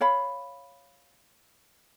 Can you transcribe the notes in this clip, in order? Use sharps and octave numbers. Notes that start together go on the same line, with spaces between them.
C#5 F5 B5